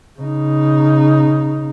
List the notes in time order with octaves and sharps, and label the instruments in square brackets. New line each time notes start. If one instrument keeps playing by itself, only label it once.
[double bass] C#3 D#4